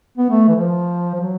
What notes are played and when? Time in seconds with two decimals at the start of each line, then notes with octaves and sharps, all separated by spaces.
0.18 B3
0.30 A3
0.48 E3
0.56 F3
1.14 F3
1.20 F#3